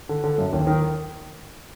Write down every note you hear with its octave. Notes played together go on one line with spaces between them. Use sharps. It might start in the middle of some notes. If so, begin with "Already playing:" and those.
D3
D3
F#2
D#2
D#3